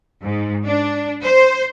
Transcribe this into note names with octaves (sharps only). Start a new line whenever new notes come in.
G#2
D4
C5